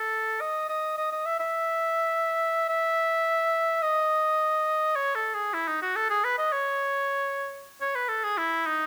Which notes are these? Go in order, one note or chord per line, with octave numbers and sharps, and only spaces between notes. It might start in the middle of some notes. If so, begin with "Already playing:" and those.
Already playing: A4
D#5
D#5
D#5
D#5
E5
E5
E5
D#5
C#5
A4
G#4
E4
D#4
F#4
A4
G#4
B4
D#5
C#5
C#5
B4
A4
G#4
E4
D#4